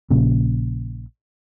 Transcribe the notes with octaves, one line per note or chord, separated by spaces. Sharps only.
A#1 A#2 C#3